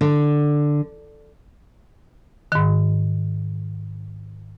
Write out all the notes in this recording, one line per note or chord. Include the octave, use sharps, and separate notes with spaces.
D3
G#2 D#3